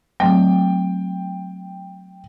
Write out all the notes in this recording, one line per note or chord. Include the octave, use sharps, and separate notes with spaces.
F#3 A3 C4 G5